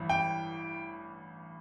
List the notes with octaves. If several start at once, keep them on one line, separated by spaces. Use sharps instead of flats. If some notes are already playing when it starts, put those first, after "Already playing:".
Already playing: A1 G2 E3
G5